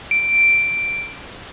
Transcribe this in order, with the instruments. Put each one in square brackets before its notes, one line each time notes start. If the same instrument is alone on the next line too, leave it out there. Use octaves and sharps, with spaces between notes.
[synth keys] D7